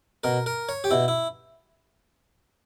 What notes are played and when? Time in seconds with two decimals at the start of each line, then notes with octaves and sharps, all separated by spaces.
0.24 B2 A#4
0.46 A#4
0.69 C#5
0.84 G4
0.91 B2 E4
1.08 E4